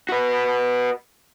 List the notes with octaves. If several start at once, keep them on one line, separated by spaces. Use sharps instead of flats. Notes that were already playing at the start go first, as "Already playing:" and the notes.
F#4 B4